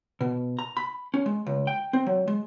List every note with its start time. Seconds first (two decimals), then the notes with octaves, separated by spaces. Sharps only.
0.21 B2
0.59 A#5
0.77 B5
1.14 C#4
1.26 G#3
1.47 C#2
1.67 G5
1.93 C4
2.06 F#3
2.27 G#3